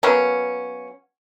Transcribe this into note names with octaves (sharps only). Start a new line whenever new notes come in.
F#3 A#3 B3 C#4